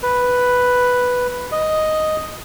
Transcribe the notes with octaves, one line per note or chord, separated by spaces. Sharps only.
B4
D#5